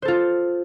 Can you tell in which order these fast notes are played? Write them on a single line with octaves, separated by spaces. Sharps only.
C5 A4 F4